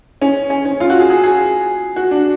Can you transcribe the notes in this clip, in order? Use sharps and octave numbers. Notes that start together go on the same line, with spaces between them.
C#4
C#4
C#4
F4
F#4
G#4
G#4
G#4
F#4
D4